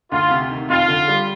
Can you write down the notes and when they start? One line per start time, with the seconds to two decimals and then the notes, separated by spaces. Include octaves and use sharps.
0.12 D2 F4
0.30 C3
0.50 D#3
0.69 F2 F4
0.88 D3
1.08 G3